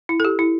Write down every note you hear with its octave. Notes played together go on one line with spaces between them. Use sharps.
E4
A4
G4
E4